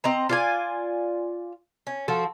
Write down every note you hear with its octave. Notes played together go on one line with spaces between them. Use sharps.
C4 D#5 A#5
F4 D5 G#5
C#4
F3 F#4 A4